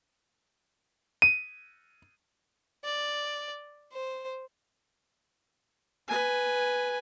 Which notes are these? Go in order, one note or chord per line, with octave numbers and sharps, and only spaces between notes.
D#7
D5
C5
B4 G#5